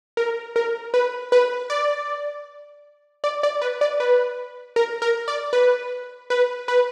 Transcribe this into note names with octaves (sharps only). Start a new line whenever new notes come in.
A#4
A#4
B4
B4
D5
D5
D5
B4
D5
B4
A#4
A#4
D5
B4
B4
B4